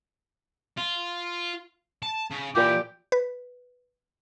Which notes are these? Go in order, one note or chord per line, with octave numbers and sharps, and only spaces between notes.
F4
A5
C#3
A#2 E3 G4
B4